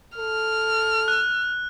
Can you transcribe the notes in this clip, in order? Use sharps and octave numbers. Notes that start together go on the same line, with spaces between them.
A4 F6
F#6